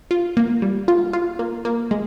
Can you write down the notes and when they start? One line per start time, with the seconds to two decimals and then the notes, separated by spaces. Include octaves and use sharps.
0.11 F4
0.37 A#3
0.62 G3
0.88 F4
1.13 F4
1.39 A#3
1.65 A#3
1.91 G#3